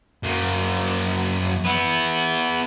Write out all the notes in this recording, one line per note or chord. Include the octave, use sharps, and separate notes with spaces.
F#2 A#3
B3 E4